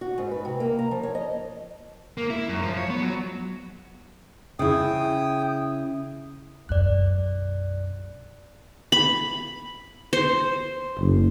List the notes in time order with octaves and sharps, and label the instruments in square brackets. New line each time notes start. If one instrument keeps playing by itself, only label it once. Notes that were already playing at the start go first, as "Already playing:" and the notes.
[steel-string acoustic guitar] F#4
G#2
B4
C3
A#3
A#5
F3
C#5
D#5
[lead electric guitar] A#3
E4
F#2
F3
C#5
B3
F#3
[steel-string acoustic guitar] C#3 E4 [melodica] G5 D#6
[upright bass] B1 F#2 [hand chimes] D5 F#6
[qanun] B5
C5
[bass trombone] F#1